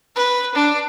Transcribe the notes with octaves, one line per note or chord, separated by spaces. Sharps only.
B4
D4